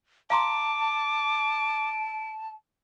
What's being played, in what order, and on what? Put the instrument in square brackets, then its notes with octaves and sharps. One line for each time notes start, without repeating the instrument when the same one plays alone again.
[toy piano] F5 A#5 C6 [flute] A5 [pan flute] D6 [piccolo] D7